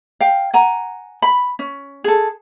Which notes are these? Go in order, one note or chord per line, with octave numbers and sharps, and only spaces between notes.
F5 G5
F#5 G#5 A#5
B5
C#4
G#4 A4